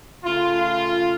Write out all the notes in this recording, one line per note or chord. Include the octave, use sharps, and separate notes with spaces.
C#3 A3 F4